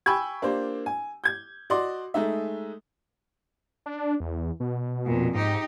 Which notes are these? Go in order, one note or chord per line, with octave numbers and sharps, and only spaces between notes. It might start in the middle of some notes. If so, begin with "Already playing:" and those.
G5 G#5 B5 C#6 E6 G#6
A#3 D4 F4 G4 C5
G#5
G6 G#6
F#4 D5 D#5 C6
G#3 A3 D#4 E5
D4
E2
B2
F2 A#2
G#2 D#4 G4